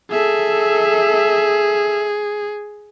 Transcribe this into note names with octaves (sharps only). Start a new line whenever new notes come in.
G#4 A4 E5